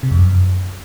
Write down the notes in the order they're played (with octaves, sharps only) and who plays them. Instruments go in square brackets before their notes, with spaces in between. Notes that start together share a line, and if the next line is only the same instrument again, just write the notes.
[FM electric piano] C3
F2
F#2